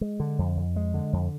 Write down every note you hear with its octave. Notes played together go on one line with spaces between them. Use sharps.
G#3
D3
F2
F2
G#3
D3
F2